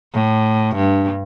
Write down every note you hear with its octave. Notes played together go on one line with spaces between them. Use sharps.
A2
G2